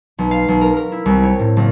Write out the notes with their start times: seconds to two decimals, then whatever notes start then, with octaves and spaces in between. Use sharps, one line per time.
0.19 B1
0.31 F5
0.48 B1
0.61 A#4
0.77 A#4
0.92 E4
1.06 C2
1.23 C#5
1.39 A2
1.57 F#1